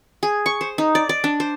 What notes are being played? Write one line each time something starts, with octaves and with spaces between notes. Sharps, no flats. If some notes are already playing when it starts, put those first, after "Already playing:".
G#4
C#6
C5
D#4
D5
D5
D4
C5